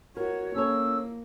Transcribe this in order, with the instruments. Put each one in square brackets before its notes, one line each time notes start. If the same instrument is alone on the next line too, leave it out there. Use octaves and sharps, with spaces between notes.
[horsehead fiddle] F#4 C#5 [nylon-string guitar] A#4
[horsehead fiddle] A#3 [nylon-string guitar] C#4 A4 C#5 [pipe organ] E6